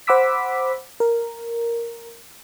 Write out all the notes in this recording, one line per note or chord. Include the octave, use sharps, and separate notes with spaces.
C5 F#5 B5 D6 E6 B6
A#4